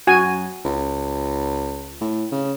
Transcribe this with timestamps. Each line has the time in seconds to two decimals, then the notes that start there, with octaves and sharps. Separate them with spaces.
0.07 F#2 F#4 G#5
0.65 C#2
2.01 A2
2.32 C#3